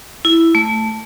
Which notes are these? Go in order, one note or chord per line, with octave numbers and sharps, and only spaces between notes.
E4
A3